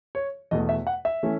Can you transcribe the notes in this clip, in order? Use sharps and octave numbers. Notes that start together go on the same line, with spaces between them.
C#5
E2 B2 A3 D#5
E5
F#5
E5
E3 A3 C#4